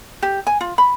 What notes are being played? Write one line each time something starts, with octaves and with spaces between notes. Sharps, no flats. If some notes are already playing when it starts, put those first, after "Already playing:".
G4
G#5
F4
B5